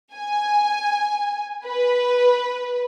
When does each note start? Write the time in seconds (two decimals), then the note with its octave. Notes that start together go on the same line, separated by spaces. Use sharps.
0.14 G#5
1.65 B4